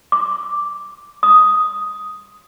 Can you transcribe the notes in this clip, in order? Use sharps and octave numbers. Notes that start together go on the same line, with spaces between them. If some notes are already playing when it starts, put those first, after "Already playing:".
D6
D#6